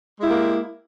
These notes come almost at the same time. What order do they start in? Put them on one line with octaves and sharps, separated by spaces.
G#3 E4 G4 A#3